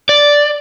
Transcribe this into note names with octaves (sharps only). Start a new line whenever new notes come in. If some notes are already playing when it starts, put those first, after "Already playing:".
D5